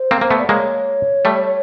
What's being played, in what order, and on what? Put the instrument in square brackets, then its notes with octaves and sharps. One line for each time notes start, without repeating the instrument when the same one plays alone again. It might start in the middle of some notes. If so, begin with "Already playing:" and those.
Already playing: [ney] C5
[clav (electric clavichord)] A#3 C4
A#3
A3 B3
[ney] D5
[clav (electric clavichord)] G#3 A#3 [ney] C#5
[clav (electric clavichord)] G3 A3